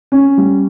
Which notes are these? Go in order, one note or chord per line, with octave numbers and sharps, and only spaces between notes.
C#4
G3